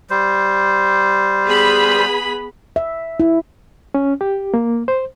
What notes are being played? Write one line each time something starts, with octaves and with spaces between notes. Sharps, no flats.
G3 C5
B3 G#4 B5
E5
E4
C#4
G4
A#3
C5